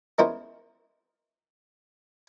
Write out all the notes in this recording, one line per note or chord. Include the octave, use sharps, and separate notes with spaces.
G#3 B3 C#4 E4 A#4 C5